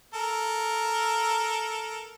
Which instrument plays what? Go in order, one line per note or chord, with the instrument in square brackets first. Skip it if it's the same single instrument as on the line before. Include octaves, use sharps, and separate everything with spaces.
[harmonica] A4 A#4